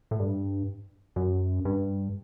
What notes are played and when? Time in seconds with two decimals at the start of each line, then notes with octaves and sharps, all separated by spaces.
0.11 A2
0.19 G2
1.16 F#2
1.65 G2